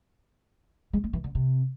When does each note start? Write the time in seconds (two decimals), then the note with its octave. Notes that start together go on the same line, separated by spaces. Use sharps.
0.93 G#3
1.04 A3
1.13 E3
1.24 D3
1.35 C3